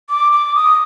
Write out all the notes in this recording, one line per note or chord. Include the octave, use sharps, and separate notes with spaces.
D6
D6
D#6